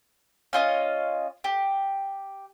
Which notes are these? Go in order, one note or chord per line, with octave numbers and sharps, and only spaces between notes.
C#4 F4 D#5
G4